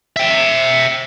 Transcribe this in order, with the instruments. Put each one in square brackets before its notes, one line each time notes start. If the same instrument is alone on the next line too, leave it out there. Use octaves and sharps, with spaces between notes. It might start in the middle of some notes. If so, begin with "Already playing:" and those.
[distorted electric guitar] E5 G5